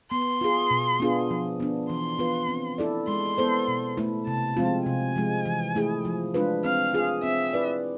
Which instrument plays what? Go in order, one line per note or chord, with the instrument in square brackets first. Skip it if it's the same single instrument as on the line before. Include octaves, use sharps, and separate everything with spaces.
[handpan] B3 [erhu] C6
[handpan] F4 G#4
B2
B3 D4 F4 G#4
F3
B3 D4
[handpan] E3 [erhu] C6
[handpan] B3 F4 B4
C4
E4 A4 D5
[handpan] G#3 [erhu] C6
[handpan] B3 E4 A4 C5
B2
A3 E4
[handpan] C3 [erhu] A5
[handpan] F3 G#3 C4 F4
[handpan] C3 [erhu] G#5
[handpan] F3 G#3
E3
A3 E4 G#4
F3
G#3 D4 F4 B4
[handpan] C4 [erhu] F5
[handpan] F4 G#4
[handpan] C4 [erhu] E5
[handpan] E4 B4 D5